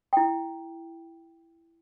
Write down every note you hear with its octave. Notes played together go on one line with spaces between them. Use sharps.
E4 G5